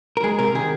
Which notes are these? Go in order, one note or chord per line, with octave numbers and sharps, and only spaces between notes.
A#4
G#3 G#4
C3 A#4
D#3 G#4